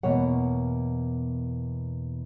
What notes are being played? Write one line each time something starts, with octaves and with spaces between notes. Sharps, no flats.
E2 B2 A#3 C#5 F#5